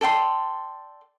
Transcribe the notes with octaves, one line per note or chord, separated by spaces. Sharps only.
A4 D5 G5 C6